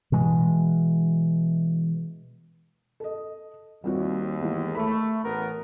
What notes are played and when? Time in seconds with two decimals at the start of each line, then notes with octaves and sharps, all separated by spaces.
0.12 B2 E3 G#3
3.00 A4 D#5
3.84 D#2 G3 C4 F#4
4.40 E3 G#3 B3
4.75 A3 B5
5.23 A1 B3 A#4